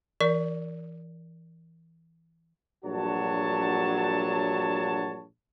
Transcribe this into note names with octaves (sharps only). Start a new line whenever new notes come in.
E3 A#4 D5
A#1 G2 F#3 F#4 C#5 A5